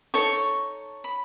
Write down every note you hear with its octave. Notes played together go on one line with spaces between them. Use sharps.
D#4 A4 C#5 C#6
B5